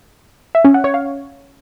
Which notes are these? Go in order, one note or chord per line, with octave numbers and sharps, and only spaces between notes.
E5
C#4
F#5
C#5
F5